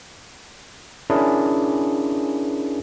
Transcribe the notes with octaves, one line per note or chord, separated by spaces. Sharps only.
C#4 D4 E4 G#4 A#4